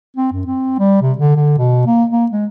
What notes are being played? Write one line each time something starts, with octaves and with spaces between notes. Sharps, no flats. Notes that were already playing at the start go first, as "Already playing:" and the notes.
C4
F#2
C4
G3
C3
D3
D3
B2
A#3
A#3
G#3